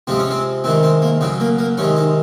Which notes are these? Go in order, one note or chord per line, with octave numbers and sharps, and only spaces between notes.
C3 F3 G#3 C4
C#4
C4
C3 D#3 G#3 C4
C4
A#3
C#3 F#3 C4
A#3
A#3
C3 D#3 G#3 C#4
D#4